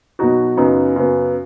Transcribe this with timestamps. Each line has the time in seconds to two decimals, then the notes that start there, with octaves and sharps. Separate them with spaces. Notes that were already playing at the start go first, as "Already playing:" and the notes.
0.19 B2 F#3 D#4 F#4
0.57 F#2 C#3 B3 D#4
0.96 F#2 C#3 B3